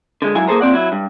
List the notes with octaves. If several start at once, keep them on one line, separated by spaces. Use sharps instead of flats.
D3 G#3
G#2 F#3 E4 G#5
A#3 G#4 A4 C5 A#5
A#2 C4 D5 F#5
F#3 E4
G2